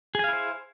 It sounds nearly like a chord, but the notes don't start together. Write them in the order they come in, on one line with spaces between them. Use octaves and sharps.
G#4 G#5 F5 E4 C5